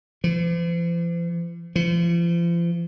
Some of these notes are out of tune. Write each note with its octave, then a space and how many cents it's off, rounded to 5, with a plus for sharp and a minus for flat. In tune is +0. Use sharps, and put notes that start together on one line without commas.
F3 -45
F3 -40